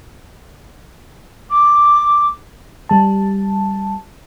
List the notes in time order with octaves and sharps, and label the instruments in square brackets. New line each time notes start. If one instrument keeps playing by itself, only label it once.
[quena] D6
[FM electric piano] G3 A5